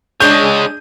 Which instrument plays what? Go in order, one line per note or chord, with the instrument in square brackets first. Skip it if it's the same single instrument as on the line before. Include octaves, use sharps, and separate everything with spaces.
[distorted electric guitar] G#3 C#5 [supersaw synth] D4 G#4 D#7 [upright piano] G6